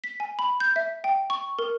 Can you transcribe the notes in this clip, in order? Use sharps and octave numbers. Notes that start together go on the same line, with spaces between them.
B6
G#5
B5
G6
E5
G5
C#6
A#4